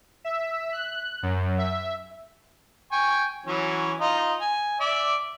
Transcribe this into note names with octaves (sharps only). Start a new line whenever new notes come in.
E5
F#6
F#2
E5
G5 G#5 C#6
E3 F#3 C#4
D#4 F4 D#5
G#5
D5 E5 D6